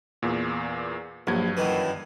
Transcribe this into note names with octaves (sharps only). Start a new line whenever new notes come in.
E2 A#2
A#1 G2 F#3 G#6
F#2 D#3 E3